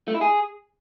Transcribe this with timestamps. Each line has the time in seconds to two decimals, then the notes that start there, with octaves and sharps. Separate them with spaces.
0.08 A3
0.14 E4
0.21 G#4